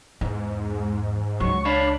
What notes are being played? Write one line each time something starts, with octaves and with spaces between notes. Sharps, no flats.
E2 G#2
C#2 F#3 C#6
D4 C#5 F5 A5 B5